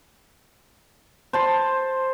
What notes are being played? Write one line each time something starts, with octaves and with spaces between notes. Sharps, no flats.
C5 A5 C6